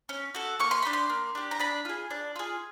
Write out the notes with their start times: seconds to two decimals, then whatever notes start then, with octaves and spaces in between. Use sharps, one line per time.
0.09 C#4
0.35 F#4 A4
0.60 A#3 C#6
0.71 C6
0.82 D4 G4 B5
0.93 C6
1.10 A#3
1.35 D4 G4
1.51 A#5
1.59 D4 B5
1.85 F4 G#4
2.11 D4
2.36 F4 G#4